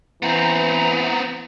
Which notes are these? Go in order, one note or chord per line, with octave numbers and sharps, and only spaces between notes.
E3 B3 C4 A#5